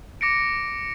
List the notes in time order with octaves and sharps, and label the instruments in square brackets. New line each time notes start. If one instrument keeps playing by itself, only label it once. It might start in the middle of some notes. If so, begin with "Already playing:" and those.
[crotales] D6 A#6 C#7 D7